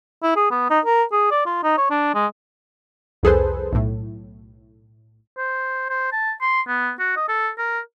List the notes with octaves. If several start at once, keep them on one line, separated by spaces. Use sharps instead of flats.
E4
G#4
B3
D#4
A#4
G#4
D5
F4
D#4
C#5
D4
G#3
C2 F2 G#4 A4 B4 C5
B1 A2
C5
C5
A5
C6
B3
F#4
D#5
A4
A#4